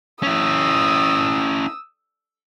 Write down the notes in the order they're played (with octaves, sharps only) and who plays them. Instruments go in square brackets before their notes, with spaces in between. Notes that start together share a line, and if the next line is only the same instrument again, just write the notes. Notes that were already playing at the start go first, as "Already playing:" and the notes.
[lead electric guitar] C#4 E4 [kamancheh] D#6 E6